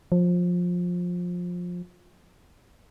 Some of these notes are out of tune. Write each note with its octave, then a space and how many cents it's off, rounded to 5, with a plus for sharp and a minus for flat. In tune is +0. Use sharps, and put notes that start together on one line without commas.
F3 +20